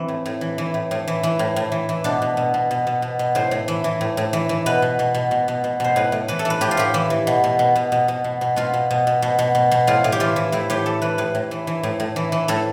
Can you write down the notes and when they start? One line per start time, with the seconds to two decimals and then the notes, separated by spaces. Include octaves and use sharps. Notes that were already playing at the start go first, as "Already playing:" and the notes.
Already playing: E3 C4
0.08 A2
0.26 A2
0.41 E3
0.58 E3
0.74 A2
0.91 A2
1.08 E3
1.23 E3
1.39 A2
1.56 A2
1.72 E3
1.89 E3
2.04 B2 D4
2.22 B2
2.37 B2
2.54 B2
2.71 B2
2.87 B2
3.02 B2
3.19 B2
3.35 A2 C5
3.51 A2
3.68 E3
3.84 E3
4.01 A2
4.17 A2
4.33 E3
4.49 E3
4.66 B2 B4
4.82 B2
4.99 B2
5.14 B2
5.31 B2
5.48 B2
5.64 B2
5.80 B2 C5
5.96 A2 B4
6.12 A2
6.28 E3 B4
6.39 A4
6.45 E3
6.50 B4
6.61 A2 G4
6.71 F4
6.77 A2 G4
6.94 E3
7.10 E3
7.27 B2
7.44 B2
7.59 B2
7.76 B2
7.92 B2
8.08 B2
8.24 B2
8.41 B2
8.56 B2 F4
8.74 B2
8.91 B2
9.07 B2
9.22 B2
9.39 B2
9.55 B2
9.71 B2
9.87 A2 F4
10.04 A2
10.12 G4
10.20 E3 F4
10.36 E3
10.52 A2 E4
10.70 A2 G4
10.86 E3 A4
11.02 E3 B4
11.18 A2 B4
11.35 A2
11.51 E3
11.67 E3
11.83 A2
12.00 A2
12.16 E3
12.32 E3
12.48 A2 A4